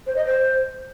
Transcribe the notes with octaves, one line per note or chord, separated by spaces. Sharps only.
C5
D#5
C5